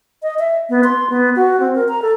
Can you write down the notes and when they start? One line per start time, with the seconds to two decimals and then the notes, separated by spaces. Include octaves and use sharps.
0.23 D#5
0.39 E5
0.70 B3
0.84 C6
1.10 B3
1.36 F#4
1.60 C4
1.75 A#4
1.89 A#5
2.02 A4